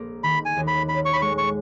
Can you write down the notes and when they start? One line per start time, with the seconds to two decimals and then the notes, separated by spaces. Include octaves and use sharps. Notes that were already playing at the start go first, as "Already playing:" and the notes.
Already playing: A#1 A#2 A#3
0.23 D#3 B5
0.46 G#5
0.56 D#2
0.67 B5
0.89 C#4 B5
1.05 C#6
1.13 B5
1.22 G#3 C#6
1.38 C#6